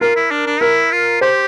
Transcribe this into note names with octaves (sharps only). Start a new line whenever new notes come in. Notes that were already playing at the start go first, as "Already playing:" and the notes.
F4 A#4
E4
D4
D4
E4 A#4
F4
G4 C5